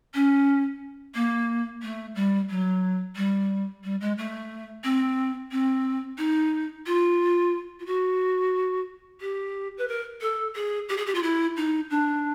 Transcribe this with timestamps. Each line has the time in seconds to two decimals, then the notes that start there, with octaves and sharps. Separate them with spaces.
0.14 C#4
1.15 A#3
1.82 A3
2.15 G3
2.50 F#3
3.16 G3
3.84 G3
4.01 G#3
4.18 A3
4.84 C4
5.52 C4
6.18 D#4
6.86 F4
7.80 F4
7.86 F#4
9.21 G4
9.78 B4
9.88 A#4
10.21 A4
10.55 G#4
10.89 G4
10.97 G#4
11.06 G4
11.15 F4
11.23 E4
11.57 D#4
11.90 D4